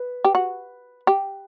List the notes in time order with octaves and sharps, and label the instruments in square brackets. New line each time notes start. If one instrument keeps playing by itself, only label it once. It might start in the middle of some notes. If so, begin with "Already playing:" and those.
Already playing: [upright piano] B4
[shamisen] G4
F#4
G4